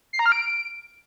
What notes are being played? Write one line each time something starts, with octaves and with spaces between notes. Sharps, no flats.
C7
A#5
F6
D7